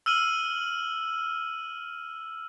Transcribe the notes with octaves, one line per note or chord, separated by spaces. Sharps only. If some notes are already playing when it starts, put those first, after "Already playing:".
E6 F6 D#7 F#7